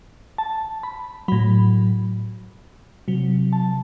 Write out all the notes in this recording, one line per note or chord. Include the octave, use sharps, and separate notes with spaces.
A5
B5
A2 F#3 B5
C3 F#3
A5